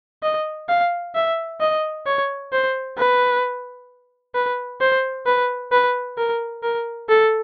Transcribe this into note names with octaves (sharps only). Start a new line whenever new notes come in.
D#5
F5
E5
D#5
C#5
C5
B4
B4
C5
B4
B4
A#4
A#4
A4